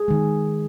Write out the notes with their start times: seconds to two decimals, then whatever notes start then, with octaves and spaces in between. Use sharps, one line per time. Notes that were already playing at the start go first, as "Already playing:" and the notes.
Already playing: G#4
0.08 D#3 G#3